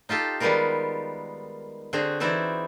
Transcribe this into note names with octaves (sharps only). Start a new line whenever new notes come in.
D#4 F4 G4 A4
D#3 G3 G#3 B3 F4 A#4
D3 C4 F#4 G#4
E3 C4 D#4 E4 F#4 D5